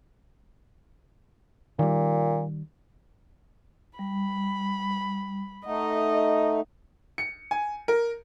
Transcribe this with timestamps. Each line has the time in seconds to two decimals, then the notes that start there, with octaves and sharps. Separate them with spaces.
1.79 A#2 D#3 G3
3.99 G3 B5
5.66 A3 D#4 D#5 F#5
7.18 C#7
7.51 G#5
7.88 A#4